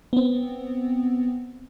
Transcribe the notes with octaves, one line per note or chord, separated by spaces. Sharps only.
B3 C4